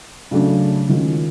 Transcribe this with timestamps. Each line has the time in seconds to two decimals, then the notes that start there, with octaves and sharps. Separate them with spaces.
0.31 C#3 F#3 A3 D4
0.89 D#3 G#3 C#4 F4